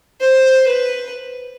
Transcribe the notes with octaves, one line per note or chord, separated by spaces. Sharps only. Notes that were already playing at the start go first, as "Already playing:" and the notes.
C5
B4